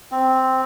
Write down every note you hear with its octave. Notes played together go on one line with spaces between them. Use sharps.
C4